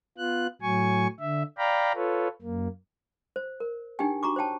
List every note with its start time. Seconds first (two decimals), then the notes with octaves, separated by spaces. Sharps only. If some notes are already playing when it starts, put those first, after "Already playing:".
0.18 B3 F4 F#6
0.62 A2 F#3 G#5 C#6
1.20 D3 E5
1.58 D5 F5 G5 A#5 B5
1.95 F4 A4 B4 C#5
2.42 F#2 A#3
3.36 C5
3.60 A#4
3.99 D4 D#4 G4 G5 G#5
4.23 F#4 A#5 C#6 D6
4.36 C5 C#5 G5 A5